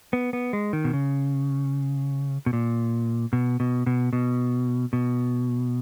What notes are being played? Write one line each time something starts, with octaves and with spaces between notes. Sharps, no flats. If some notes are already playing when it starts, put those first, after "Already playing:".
B3
B3
G#3
D#3
B2
C#3
B2
A#2
B2
B2
B2
B2
B2